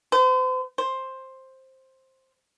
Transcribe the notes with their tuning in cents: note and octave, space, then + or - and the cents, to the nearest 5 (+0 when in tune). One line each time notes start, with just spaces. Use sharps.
C5 -40
C5 +10